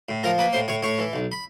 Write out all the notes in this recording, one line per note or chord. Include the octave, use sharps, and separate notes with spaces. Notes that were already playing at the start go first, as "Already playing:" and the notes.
A2
F3 A#4 A#5
A#3 B4 B5
A2 C5 C6
A2 C#5 C#6
A2 C#5 C#6
E3
B1
B5